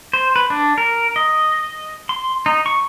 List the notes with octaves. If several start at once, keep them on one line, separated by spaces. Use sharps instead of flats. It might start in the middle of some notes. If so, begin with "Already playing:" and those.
C5
B4
D4
A#4
D#5
C6
D#4
C#6